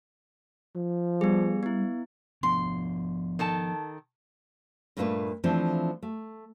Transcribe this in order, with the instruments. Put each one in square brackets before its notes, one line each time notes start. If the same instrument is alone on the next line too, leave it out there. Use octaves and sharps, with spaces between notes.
[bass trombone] F3
[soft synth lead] G3 [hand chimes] B3 G#4
[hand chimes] B3 E4
[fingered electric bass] F3 B3 D4 [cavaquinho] C6
[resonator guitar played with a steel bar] D#3 A4 A5
[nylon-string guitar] G2 A#2 A3 A#3 D4 B4
E3 F3 A3 C4 D4
A3